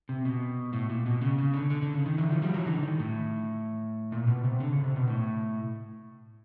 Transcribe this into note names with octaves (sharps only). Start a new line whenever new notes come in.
C3
B2
A2
A#2
B2
C#3
C#3
D3
D3
D3
C#3
D#3
D3 E3
D#3 F3
F3 G3
E3 F#3
D3 E3
D#3
A2
A#2
B2
C3
D3
C#3
C3
B2
A2